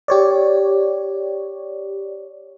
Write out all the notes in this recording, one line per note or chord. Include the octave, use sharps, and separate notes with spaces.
G4 C#5 D5